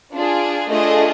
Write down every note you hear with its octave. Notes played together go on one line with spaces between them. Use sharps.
D4 F4 G#4
A3 D4 F4 G#4 D#5